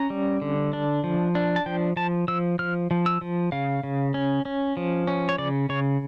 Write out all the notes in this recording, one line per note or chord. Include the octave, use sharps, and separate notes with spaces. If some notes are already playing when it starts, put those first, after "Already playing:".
Already playing: C#4 A#5
G3
D3
D4
F3
D4
A5
F3 G5
F3 A5
F3 E6
F3 F6
F3
E6
F3
C#3 F5
C#3
C#4
C#4
F3
C#4
C#5
C#3 D5
C#3 C#5